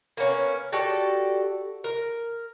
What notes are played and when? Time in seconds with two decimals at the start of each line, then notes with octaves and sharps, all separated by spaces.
0.17 A#3 B3 C#4
0.72 F#4 G4 A4 D5
1.84 A#4